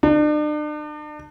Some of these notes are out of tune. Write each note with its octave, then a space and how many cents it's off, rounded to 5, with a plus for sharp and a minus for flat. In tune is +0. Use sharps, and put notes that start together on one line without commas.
D4 +40